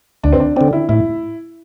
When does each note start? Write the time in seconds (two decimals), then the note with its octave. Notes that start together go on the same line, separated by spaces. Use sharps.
0.23 D2 D4
0.32 C4
0.40 D4
0.56 D3 C4 D4
0.73 E4
0.89 A2 E4